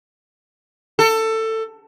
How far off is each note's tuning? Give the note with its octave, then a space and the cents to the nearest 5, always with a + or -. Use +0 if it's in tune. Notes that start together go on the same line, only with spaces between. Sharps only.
A4 +20